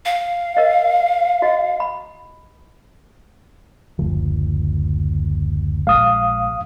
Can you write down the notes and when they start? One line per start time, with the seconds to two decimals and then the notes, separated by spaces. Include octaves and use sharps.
0.05 F5
0.57 A#4 D#5
1.42 F#4 D#5
1.80 B5
3.99 F#1 D2 F3
5.87 A#1 G#3 F5 D#6